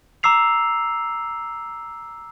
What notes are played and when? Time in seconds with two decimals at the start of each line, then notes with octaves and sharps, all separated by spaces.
0.23 A#5 D6 E6 C7 F7